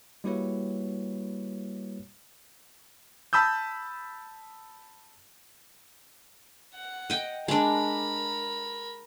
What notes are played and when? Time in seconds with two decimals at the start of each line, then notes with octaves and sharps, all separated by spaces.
0.24 G3 A#3 E4 F#4 B4 C#5
3.33 A5 B5 D#6 E6 G6
6.74 F#5
7.10 D#5 G5
7.48 G#3 D4 A#4 B5